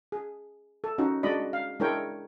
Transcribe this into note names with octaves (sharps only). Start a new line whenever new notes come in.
G#4
A4
C#4 D#4 F#4
G#3 D4 F#4 D5 D#5 B5
F5
G#3 D4 E4 A#4 C#5 G5